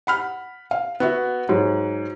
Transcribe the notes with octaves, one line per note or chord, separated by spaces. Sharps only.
F#5 B5 F6
F5
B3 F#4 E5
G#2 F#3